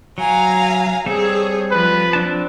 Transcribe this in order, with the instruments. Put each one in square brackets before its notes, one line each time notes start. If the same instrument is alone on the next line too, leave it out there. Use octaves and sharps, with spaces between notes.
[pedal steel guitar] F#3 [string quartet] F5 G#5 A#5
[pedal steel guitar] G3 C4 A4 [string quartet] G#4 C#5
[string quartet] F3 [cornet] B4
[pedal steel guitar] C4 D4 A5